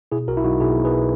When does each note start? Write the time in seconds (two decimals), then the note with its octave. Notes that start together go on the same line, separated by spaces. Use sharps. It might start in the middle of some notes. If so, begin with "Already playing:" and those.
0.12 B2 E4 G#4
0.28 B1 F#4 A#4
0.37 E4
0.44 B1 D#4 F#4
0.60 B2 E4 G#4
0.77 B2
0.85 G#4 B4